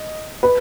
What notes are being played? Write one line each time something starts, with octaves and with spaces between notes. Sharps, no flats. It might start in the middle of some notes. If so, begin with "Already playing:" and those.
Already playing: D#5
B4